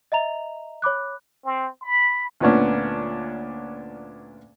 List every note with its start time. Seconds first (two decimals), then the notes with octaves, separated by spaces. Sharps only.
0.12 D#5 E5 A#5 F7
0.82 C#5 B5 D6 F#6
1.45 C4
1.82 B5
2.40 D2 A#2 B3 C#4 D4